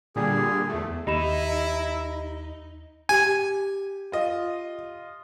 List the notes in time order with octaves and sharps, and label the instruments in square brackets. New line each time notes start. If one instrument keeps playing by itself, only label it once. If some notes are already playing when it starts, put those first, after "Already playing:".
[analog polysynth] A#2 D3 G3 [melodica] G#4
[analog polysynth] E2 A3
[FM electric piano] D#2 [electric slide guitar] D#4 [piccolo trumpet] E4 [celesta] G4 B5 E7
[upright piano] G4 [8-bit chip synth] G#5
[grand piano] F4 D#5